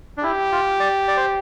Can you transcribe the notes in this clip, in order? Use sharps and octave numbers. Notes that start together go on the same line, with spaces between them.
D4
E4 G4
F4
D5
D5
C5